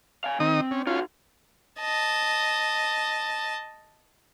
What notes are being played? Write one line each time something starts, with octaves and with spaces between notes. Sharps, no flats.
F5 G#5
D#3 C4 D#4 D#6
C#4
C#4 D#4 F4 F#4
D#5 A5